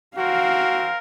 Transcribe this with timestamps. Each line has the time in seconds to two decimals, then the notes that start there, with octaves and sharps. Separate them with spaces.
0.17 C4 F#4 A#4 F5